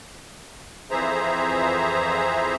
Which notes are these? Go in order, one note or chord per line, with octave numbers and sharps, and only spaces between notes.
F2 E3 G#4 C5 E5 A#5